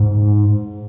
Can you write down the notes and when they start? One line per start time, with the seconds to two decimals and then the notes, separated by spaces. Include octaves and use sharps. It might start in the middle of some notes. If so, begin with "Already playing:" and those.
Already playing: G#2